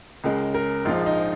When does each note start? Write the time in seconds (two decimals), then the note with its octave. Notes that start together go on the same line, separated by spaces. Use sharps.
0.24 C#2 C#3 G#3 A#4
0.54 A#4
0.85 A#1 G#2 F3 G#3 F4
1.06 D#4